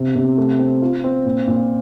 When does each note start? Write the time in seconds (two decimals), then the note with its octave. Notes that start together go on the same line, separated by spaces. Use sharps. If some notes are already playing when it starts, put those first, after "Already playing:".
Already playing: C3
0.16 C3
0.38 A3
0.59 C4
0.82 F4
1.04 C4
1.25 A#2
1.47 A#2